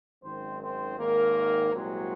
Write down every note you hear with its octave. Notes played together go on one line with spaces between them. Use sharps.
G#1 F#2 D#3 G#3 C4 C5
C4 C5
G#1 G#2 D#3 A#3 A#4
C2 A#2 F#3 G#3 C4 F#4